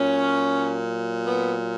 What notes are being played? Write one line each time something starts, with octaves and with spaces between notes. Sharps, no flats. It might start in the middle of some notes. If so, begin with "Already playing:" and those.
Already playing: A#2 F#3 C#4
B3